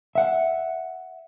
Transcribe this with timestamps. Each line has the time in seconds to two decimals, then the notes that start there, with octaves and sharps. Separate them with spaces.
0.15 E5 F#5